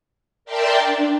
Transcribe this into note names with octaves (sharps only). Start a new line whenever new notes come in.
A#4 D5 E5 G5 A5 C6
D4